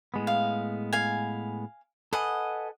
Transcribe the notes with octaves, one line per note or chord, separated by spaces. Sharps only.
A2 G#3 B3
F5
F5 G#5
A4 B4 D#5 F#5 G#5